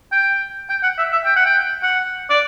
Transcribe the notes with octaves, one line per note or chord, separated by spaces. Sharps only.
G5
G5
F#5
E5
E5
G5
F#5
G5
F#5
D5